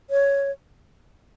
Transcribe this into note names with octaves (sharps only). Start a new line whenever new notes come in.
C#5